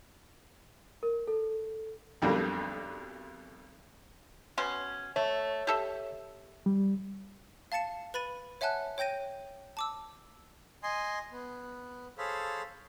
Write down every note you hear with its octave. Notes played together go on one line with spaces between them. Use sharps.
A#4
A4
B1 F2 B2 D3 G3 A#3
B2 C#4 C6
A3 C#5
G4 A4 E5
G3
F5 A5 A6 C#7 E7
B4 B5 A6 D#7
C#5 E5 F#5 G#5 A5 F#6
C#5 G5 G6 A#6 D#7
A5 D6 E6
D#5 G#5 C6
B3
G#4 A4 C5 C#5 F5 B5